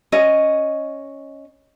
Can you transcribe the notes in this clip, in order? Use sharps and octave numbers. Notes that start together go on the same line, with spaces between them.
C#4 D#5